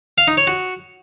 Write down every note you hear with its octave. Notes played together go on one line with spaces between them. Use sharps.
F5
D#4
C#5
F#4